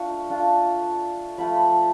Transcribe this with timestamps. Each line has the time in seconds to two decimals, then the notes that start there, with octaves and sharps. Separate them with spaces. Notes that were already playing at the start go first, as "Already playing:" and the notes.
Already playing: A3 D4 F4 C#6
0.30 A3 D4 F4
1.38 F3 A3 F4 B5